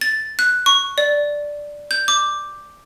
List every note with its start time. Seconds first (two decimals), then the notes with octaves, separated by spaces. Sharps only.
0.01 A6
0.39 F#6
0.66 C#6
0.98 D5
1.91 G6
2.08 D6